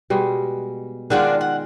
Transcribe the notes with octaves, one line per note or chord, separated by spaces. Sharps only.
B2 G3 G#3
D#3 G#3 D4 F4 F#4 D5
F#5